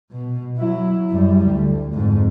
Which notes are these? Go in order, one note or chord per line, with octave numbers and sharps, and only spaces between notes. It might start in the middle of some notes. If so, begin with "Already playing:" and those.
B2
F#3 E4
F#2 G3
D2
F2 G#2